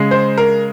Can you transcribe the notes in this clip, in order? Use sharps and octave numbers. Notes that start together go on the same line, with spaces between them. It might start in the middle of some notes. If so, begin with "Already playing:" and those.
Already playing: C#3 G#3
C5
A#4